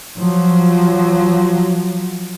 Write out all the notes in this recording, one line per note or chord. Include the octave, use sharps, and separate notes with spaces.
F3 F#3